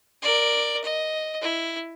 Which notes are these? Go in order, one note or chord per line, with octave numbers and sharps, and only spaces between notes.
A#4 D5
D#5
E4